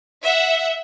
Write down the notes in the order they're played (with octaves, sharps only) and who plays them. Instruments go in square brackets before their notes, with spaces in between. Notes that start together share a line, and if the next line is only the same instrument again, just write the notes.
[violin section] E5 F#5